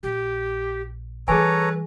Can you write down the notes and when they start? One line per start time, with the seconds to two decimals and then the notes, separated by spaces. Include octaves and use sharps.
0.03 A#1 G4
1.28 E3 G3 G#4 A4 B4 C#5 G#5 A#5